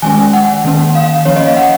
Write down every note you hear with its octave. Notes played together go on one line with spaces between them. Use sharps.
D#3 G#3 C#4 G#5
F#5
D#3 A#3 C#4
F5
F3 A#3 C#4 C#5
D#5
F5
F#5